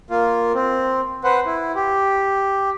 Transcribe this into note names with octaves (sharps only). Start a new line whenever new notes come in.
A#3 F4
C4
B4 C5 F#5
E4
G4